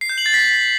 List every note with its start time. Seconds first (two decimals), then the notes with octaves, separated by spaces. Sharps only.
0.01 C7
0.09 G6
0.18 F#7
0.26 A6
0.34 B6